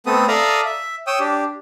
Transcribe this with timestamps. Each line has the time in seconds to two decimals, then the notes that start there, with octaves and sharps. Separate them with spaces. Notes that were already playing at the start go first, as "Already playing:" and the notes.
0.06 A3 B3 C4 A4 D#6
0.28 A4 D5 E5 F5 A#5 D#6
0.66 E5
1.07 C#5 G5 D#6 E6
1.20 D4 G4